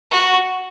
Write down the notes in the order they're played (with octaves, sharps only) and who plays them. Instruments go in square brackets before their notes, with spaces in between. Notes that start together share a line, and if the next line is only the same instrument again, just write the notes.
[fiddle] F#4